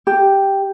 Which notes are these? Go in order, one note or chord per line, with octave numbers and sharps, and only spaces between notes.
G4